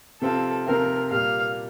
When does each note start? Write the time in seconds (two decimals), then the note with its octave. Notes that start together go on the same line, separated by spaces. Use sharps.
0.22 C3 F3 C4 F4 A4
0.67 C3 F3 C4 F4 A#4
1.11 A#2 G3 A#3 F5